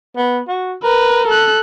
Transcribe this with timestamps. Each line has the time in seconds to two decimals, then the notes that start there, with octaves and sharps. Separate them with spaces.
0.16 B3
0.48 F#4
0.83 A#4 B4
1.28 A4 F#6